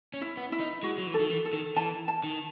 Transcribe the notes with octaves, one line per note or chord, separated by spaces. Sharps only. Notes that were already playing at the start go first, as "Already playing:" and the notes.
C#4
E4
B3
E4
D#4
G#3 F#4
F#3
E3
A4
D#3
E3
A4
D#3
E3 A5
A5
D#3